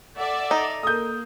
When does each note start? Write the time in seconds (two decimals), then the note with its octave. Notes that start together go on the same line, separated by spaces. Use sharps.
0.17 A4 D5 E5 F#5
0.51 D#4
0.83 A#3 A4 D#6 G6